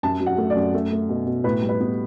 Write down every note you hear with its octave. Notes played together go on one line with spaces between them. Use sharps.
F#2 A5
F#3
F#5
A3
D5
F#2
A3
A3
B2
B2
A2 B4
G3
B4
B3